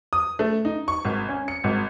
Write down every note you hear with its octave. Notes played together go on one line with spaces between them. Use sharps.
D#6
A3
D#4
C#6
G#1
C#4
C#7
G#1